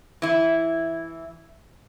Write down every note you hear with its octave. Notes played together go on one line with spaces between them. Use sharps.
E3 E4